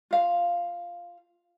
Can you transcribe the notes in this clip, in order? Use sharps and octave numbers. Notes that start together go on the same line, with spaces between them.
F4 F5